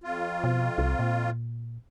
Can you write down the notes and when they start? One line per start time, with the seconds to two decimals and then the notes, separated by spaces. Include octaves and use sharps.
0.04 F2 F4
0.44 B2
0.78 C2
0.99 A#2